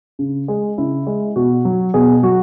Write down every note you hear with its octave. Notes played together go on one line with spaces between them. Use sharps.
C#3
G#3 G#4
C#3 E4
G#3
B2 F#4
F#3
B2 G#4
F#3 F#4